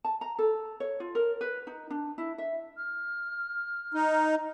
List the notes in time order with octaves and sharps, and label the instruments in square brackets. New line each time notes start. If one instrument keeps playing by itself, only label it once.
[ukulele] A5
A#5
A4
C#5
F4
A#4
B4
D#4
D4
E4
E5
[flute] F6
[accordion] D#4